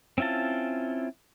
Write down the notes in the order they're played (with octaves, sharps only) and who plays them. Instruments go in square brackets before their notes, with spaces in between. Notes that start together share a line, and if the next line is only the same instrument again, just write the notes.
[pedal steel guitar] C4 C#4 E4 F4 A5